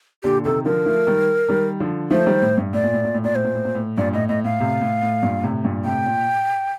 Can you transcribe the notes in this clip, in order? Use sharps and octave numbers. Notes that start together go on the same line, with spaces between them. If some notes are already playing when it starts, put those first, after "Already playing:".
A#2 D3 G4
C3 D#3 A4
D3 F3 A#4
F3 A3
D#3 G3
D#3 G3
D3 F3
F3 A3 C5
D#3 G3
A2
G2
A2 D5
A#2
A2
A#2
A2
A#2 D5
A2 C5
A#2
A2
A#2
A2
G2 A#2 D5
A2 D#5
A2 D#5
A2 F5
A2 C3
A2
A2
G2 A#2
A2 C3
G2 A#2
A2 C3 G5
A#2